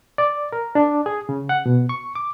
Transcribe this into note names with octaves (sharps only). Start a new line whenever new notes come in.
D5
A#4
D4
G#4
C#3
F#5
B2
C#6
D6